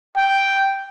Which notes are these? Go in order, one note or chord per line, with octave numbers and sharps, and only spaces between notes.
G5